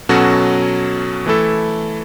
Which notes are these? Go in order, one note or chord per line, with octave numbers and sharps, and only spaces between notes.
B2 F#3 C#4 F#4 A4
E3 A3 E4 A4